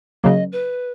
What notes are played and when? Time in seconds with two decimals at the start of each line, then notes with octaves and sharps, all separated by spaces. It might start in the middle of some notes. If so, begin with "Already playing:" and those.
0.24 C#3 F#3 A#3 D#5
0.52 B4